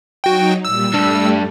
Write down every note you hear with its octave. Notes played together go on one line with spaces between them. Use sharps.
F#3 D#4 F#4 G5
A#2 G3 E6
G2 G3 A3 D4